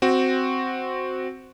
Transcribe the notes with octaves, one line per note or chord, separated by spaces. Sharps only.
C4 F#4